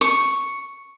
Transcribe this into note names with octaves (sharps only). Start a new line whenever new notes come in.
C#6